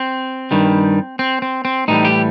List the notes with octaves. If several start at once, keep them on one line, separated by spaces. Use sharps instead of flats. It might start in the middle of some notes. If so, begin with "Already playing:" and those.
Already playing: C4
G2 D#3 G3
C4
C4
C4
A2 E3 G3 D#4
G4